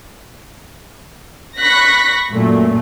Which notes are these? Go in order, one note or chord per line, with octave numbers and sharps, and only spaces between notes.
B5 C#6 F#6 A#6 B6
F#2 A#2 A3